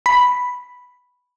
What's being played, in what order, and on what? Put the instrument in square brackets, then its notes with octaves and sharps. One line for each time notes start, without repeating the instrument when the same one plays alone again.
[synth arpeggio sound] B5